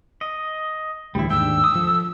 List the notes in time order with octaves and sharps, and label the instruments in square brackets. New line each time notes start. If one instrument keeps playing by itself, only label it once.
[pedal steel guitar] D#5
[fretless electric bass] D2 A2 E3 [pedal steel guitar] G3 E4
[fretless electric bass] D#2 G#2 [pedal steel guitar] D4 G5 [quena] E6
[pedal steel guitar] D#6
[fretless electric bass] F3 [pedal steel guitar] A4